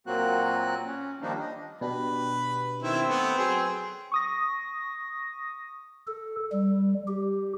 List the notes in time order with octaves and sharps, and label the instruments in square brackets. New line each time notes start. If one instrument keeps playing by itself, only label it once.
[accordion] A#2 F#3 A#3 C4 F#4 F#6
C#4
D#3 F3 G3 A#3 D4 D#4
D#5
[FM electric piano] B2 D4 G4 [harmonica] B4
[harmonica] D#3 E4 [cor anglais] C4
[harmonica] A3 B3
[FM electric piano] F#3 [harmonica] G#4
[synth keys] C#6 D#6 A#6
[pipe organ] A4
G3
G4